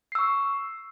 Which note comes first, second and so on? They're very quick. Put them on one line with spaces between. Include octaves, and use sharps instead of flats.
C7 E6 C#6